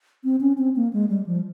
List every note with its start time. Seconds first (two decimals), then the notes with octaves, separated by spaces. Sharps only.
0.24 C4
0.41 C#4
0.58 C4
0.76 A#3
0.93 G#3
1.09 G3
1.26 F3